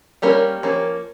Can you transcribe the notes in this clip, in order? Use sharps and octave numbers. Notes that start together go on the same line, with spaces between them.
G3 A#3 C#4 G4 A#4
F3 A#3 C#4